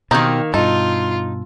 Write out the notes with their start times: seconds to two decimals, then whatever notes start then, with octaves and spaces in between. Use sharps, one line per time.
0.11 B2 D#3 A#3 C4 D#4 G4
0.54 G2 B2 D#4 F4 A4